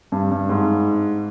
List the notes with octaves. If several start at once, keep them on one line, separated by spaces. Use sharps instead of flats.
G2
G2
G#2